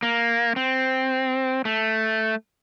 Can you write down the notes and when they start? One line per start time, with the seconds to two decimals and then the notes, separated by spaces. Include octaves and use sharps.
0.03 A#3
0.56 C4
1.65 A3